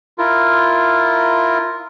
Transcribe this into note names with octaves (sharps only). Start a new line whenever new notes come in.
E4 F4 A#4